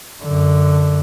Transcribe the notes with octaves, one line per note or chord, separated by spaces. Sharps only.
F#2 D3